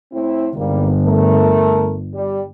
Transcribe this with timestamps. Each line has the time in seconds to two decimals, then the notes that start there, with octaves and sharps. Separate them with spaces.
0.12 A2 C4 E4
0.56 G1 G#2 G3 A#3
1.05 A3 A#4
2.14 G3